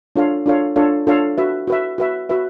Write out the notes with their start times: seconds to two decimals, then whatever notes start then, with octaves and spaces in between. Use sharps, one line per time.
0.16 D4 F4 A4 C#5 F5
0.46 D4 F4 A4 C#5 F5
0.76 D4 F4 A4 C#5 F5
1.07 D4 F4 A4 C#5 F5
1.38 F#4 B4 E5
1.67 F#4 B4 E5
1.98 F#4 B4 E5
2.29 F#4 B4 E5